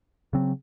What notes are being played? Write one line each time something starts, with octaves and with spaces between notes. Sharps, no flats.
C#3 F#3 C4